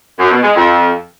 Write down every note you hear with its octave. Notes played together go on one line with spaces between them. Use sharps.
F#2
B2
G#3
F2